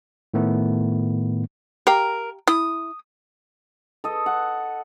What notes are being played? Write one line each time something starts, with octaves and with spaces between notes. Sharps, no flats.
A2 D#3 A3 B3
G4 A#4 F5 G5
E4 D#6
A4 D#5
F#5